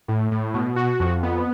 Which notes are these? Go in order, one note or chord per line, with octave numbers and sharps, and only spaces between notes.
A2
A2
B2
F#4
F2
B3